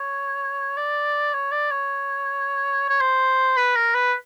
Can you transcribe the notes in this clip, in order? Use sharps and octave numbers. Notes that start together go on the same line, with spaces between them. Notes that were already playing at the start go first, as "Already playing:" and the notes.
Already playing: C#5
D5
C#5
D5
C#5
C#5
C5
B4
A#4
B4